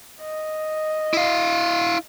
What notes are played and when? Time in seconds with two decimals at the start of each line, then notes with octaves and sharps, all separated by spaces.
0.21 D#5
1.14 E4 F5